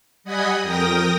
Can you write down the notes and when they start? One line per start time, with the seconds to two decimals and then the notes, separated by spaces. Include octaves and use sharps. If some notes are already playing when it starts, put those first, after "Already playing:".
0.24 G3 D#5 F#5 G#5 B5 D#6
0.62 F2 A#4 G5 D#6 A#6